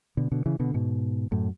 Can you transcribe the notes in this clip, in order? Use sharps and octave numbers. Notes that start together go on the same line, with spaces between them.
B2 D3
B2 D3
C#3 E3
B2 D3
G#2 B2
F#2 A2